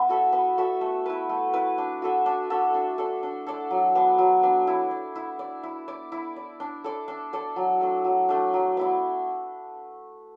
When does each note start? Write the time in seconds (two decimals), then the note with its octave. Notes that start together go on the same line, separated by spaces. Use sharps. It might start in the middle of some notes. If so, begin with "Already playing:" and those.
Already playing: B3 E4
0.09 F#4 A4 E5
0.33 B3
0.58 F#4 A4 E5
0.81 A3
1.06 E4 B4
1.29 A3
1.53 E4 B4
1.78 D4
2.02 F#4 A4 E5
2.26 D4
2.50 F#4 A4 E5
2.74 D4
2.98 A4 D5
3.23 D4
3.46 A4 D5
3.70 F#3
3.95 B3 D4
4.18 F#3
4.43 B3 D4
4.67 E4
4.91 D5
5.16 E4
5.39 D5
5.63 E4
5.88 D5
6.12 E4
6.36 D5
6.60 D4
6.84 A4 D5
7.08 D4
7.33 A4 D5
7.56 F#3
7.81 A3 D4
8.05 F#3
8.29 A3 D4
8.54 F#3
8.77 B3 E4 D5